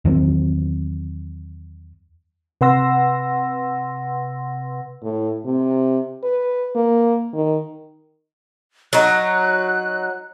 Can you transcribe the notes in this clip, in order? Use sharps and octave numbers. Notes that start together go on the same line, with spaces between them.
E2 D#3 F#3 C4
C3 B4 F#5 C6 E6 A#6
A2
C3
B4
A#3
D#3
F#3 D#4 F#6